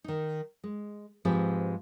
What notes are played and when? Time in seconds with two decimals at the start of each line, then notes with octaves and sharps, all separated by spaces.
0.04 D#3 D#4
0.64 G#3
1.25 G#2 F3 G#3 C4 G4 B4